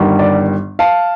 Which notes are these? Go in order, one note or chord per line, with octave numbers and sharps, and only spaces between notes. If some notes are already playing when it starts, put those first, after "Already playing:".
Already playing: G1 G2 D#3 G3
D5
F5 A5